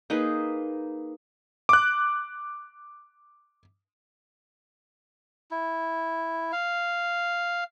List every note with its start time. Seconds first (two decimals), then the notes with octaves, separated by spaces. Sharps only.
0.10 A#3 D#4 G#4 B4
1.69 D6 F#6
5.51 E4
6.52 F5